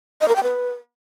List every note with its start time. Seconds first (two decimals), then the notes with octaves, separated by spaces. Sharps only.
0.21 D#5
0.28 A#4
0.36 G5
0.43 B4